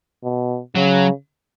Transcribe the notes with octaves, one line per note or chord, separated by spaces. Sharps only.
B2
C#3 F#3